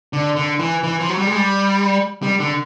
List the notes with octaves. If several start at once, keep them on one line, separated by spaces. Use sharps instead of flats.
D3
D3
E3
E3
F3
F#3
G3
G#3
G3
G3
D3